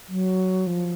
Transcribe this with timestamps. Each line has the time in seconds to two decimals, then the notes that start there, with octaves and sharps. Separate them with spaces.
0.08 F#3
0.67 F3